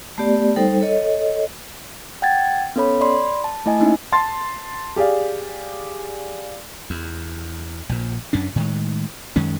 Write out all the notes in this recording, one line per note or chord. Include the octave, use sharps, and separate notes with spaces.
A3 B3 G4 D5
G3 D#4 A4 C5 G5
A4 C#5 D#5
F#5 G5 G#6 A6
B3 C#4 A4 C#5 B5
D5 B5 C6
A5
A3 E4 D#5 G#5
A#3 C#4 D#4 E4
A5 C6 A6
G4 G#4 D5 F5
E2
A#1 A#2
F#2 C#4 D4
A2 D#3 G#3
F#2 D#3 G#3 C#4